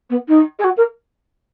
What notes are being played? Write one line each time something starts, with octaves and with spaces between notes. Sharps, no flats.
B3
D#4
G#4
F#4
A#4